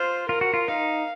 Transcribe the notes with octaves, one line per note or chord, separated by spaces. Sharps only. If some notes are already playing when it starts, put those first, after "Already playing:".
Already playing: F4 C5
F4 A#4
F#4
F4
D#4 F5